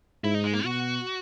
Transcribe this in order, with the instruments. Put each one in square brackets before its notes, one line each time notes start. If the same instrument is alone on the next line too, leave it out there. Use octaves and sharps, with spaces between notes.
[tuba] G#2 [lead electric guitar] E4
[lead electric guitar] D#4
G#3
A#3
[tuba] B2 [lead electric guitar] F#4